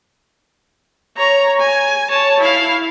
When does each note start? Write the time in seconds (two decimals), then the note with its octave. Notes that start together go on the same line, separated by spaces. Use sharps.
1.17 C#5 A#5
1.60 G#5
2.09 C#5 A5
2.39 E4 F5